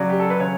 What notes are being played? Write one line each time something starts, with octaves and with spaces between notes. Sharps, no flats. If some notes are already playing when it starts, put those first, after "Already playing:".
Already playing: C#3 F#3 D5
G4
A4
B4
C#3 C#5